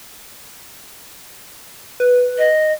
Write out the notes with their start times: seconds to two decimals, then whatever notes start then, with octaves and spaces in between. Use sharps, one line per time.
2.00 B4
2.38 D#5